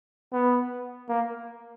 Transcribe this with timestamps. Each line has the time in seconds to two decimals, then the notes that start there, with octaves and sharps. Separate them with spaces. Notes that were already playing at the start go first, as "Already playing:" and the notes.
0.32 B3
1.09 A#3